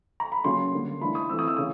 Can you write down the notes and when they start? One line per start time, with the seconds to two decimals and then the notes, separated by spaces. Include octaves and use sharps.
0.20 A#5
0.32 B5
0.44 C#3 F#3 A#3 C#4 C6
0.72 D3 G3 A#3
1.01 E3 A3 D4 B5
1.15 D#6
1.29 E3 A3 C4 E6
1.39 D#6
1.48 E6
1.57 C#3 E3 D#6